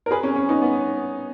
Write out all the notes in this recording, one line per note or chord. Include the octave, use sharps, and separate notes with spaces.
A#4
G#4 B4
C#4
C#4
B3 D#4
B3